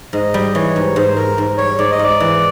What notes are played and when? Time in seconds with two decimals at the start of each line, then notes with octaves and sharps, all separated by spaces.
0.13 G#2 D#5
0.34 G3
0.54 E3 C#5
0.76 G#2
0.95 G#2 C5
1.16 G#2 A#4
1.38 G#2
1.58 G3 C#5
1.78 G#2 D5
1.92 D#5
1.99 G#2 D5
2.20 E3